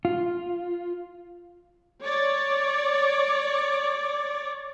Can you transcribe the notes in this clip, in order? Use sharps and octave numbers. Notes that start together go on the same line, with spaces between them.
F4
C#5 D5